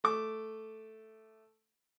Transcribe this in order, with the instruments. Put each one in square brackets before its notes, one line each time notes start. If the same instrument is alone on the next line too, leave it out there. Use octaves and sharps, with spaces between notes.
[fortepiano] A3 D6